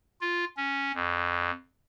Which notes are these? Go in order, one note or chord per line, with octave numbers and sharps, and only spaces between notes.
F4
C#4
F2